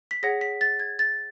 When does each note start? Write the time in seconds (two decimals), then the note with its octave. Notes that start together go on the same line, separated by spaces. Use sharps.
0.11 B6
0.23 G#4 C#5 F#5 A#6
0.41 B6
0.61 A6
0.80 G#6
0.99 A6